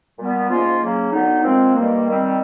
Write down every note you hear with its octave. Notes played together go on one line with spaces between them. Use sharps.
A#2 G3 B3
G#2 F3 A#3 C#4 F4
C#3 F#3 A#3 C#4
D3 F#3 B3 D#4
A#2 F3 G#3 C4
G2 D#3 G3 A#3
D#3 G3 C4